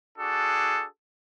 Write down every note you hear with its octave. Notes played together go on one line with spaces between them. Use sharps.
D4 F#4 G#4 A4